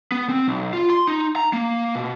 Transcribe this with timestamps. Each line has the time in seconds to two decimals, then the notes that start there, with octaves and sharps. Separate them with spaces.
0.12 B3
0.29 C4
0.48 B1
0.73 F4
0.90 C6
1.07 D#4
1.36 A#5
1.53 A#3
1.95 B2